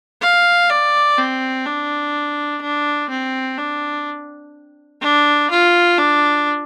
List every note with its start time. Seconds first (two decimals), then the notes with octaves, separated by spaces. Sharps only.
0.22 F5
0.70 D5
1.18 C4
1.66 D4
2.62 D4
3.10 C4
3.58 D4
5.01 D4
5.50 F4
5.98 D4